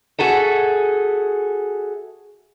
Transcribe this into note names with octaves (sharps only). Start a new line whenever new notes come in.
F#4 G#4 A4 E5